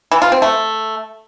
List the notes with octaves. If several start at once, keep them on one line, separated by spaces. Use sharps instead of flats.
E3
F4
C4
A3